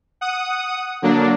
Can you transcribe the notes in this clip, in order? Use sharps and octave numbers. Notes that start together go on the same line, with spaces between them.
F#5 D#6
D3 F#3 A#3 D4